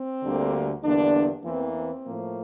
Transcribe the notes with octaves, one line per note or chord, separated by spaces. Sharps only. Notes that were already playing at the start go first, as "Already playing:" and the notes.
Already playing: C4
D2 D3 G3 A#3
E2 D3 G3 A#3 D4
E2 E3 A#3 C4
C4
A2 F3 A#3